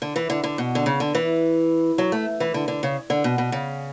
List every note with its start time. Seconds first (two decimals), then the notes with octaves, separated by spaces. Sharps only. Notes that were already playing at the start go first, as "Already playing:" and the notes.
0.02 D3
0.16 E3
0.30 D3
0.44 D3
0.58 B2
0.75 D3
0.86 C#3
1.00 D3
1.15 E3
1.98 F#3
2.12 A3
2.40 E3
2.54 D3
2.68 D3
2.83 C#3
3.10 D3
3.24 B2
3.38 B2
3.52 C#3